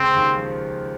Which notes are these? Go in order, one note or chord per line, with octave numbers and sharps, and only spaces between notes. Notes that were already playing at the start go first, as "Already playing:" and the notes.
Already playing: C#2 C#3 C4
D#2 D#3
F3